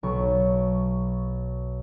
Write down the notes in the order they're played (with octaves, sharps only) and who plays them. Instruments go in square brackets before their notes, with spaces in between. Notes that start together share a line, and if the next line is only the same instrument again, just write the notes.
[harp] B1 C#6